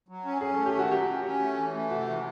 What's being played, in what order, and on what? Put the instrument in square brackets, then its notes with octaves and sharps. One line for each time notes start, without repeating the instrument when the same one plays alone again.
[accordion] F#3
C#4
[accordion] C#4 [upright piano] G#4
[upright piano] A4
[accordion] A3
[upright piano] G4
[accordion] D#3 [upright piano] F#4
[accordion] F#3 [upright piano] G4
[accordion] C#4
C#4
A3
E3
A3
[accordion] C3 [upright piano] F#4
[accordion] E3